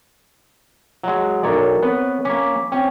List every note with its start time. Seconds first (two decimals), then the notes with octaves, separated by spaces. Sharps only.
1.03 F#3 G#3
1.43 B1 E4 A#4 C#5 D5 A#5
1.83 B3 C4 B4 C#5
2.25 A#3 C#4 D6 B6
2.72 C4 C#4 G5